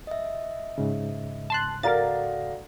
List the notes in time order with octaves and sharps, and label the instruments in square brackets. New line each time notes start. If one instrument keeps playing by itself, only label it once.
[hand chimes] D#5 E5
[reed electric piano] G#2 C#3
[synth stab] A5 C6 F#6
[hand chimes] F#4 A4 F#5 [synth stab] A#4 A6 [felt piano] D5 F5 A#5